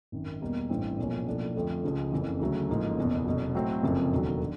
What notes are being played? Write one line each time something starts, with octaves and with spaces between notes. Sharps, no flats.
G#1 F#2 D#3
E2 B2 G3 A#3
A1 G2 E3 A3 C4
B1 A#2 F3 A#3 C#4
B1 A2 F3 A#3 D4
F2 D3 F3 A3 C4
C#2 C#3 F3
F#1 F2 C#3 E3
D2 C#3 F#3 A3
A1 G#2 F3 A#3
F#1 E2 B2
F1 E2 B2 F#3
A2 F#3 A3 C4
F#1 F2 C3 F3
E1 D#2 D3 F#3
D3